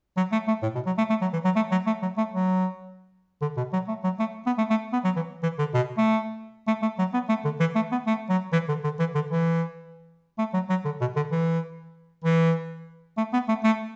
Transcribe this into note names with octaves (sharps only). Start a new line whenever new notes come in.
F#3
A3
A3
A2
B2
F#3
A3
A3
F#3
E3
F#3
A3
F#3
A3
F#3
A3
F#3
D3
B2
F#3
A3
F#3
A3
B3
A3
A3
B3
F#3
E3
E3
D3
B2
A3
A3
A3
F#3
B3
A3
D3
E3
A3
B3
A3
F#3
E3
D3
D3
E3
D3
E3
A3
F#3
F#3
D3
B2
D3
E3
E3
A3
B3
A3
A3